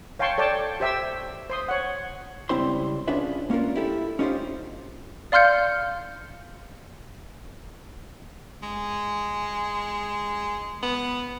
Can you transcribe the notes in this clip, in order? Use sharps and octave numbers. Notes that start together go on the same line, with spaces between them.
C#5 F5 G5 A5 C6 C#6
A4 C#5 D5 G5 A5
G4 C5 E5 G5 E6
C5 C6 D#6
C#5 F#5
C#2 G3 C4 E4 C5 C6
C#4 D4 F4 G#4 B4 E5
A#3 C#4 D4 F4 A#4
E4 G4 A4
C#4 D#4 F4 G4 C5
D5 F5 C6 F6 G6 C#7
G#3
B3